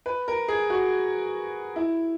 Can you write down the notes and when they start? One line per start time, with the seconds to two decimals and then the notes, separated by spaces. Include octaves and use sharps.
0.06 B4
0.28 A#4
0.48 G#4
0.70 F#4
1.76 E4